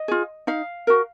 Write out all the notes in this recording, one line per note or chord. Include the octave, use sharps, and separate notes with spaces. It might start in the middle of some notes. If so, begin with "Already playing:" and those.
Already playing: D#5
F4 G#4
D#4 F5
F#4 A#4